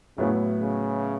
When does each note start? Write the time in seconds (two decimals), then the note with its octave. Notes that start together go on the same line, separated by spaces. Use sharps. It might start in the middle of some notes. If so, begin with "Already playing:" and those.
0.18 A2 C#3 F#3 B3 E4
0.61 C#3